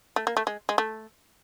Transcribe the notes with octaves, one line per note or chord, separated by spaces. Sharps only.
A3
A#3
A3
G#3
G#3
A3